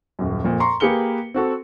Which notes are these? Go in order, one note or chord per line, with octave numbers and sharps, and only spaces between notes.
D#1 F#2
F2 A#2
A#5 C6 C#6
A#3 G4 G#4 B4 C#7 G7
C4 F#4 A4